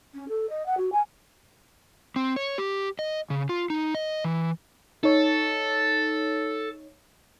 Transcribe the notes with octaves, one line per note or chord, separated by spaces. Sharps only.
C#4
A4
D#5
F#5
F#4
G#5
C4
C#5
G4
D#5
C#3
F4
D#4
D#5
E3
D#4 A4 C#5